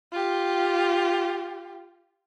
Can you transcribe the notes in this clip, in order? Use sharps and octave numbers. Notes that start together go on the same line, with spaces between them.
F4 G4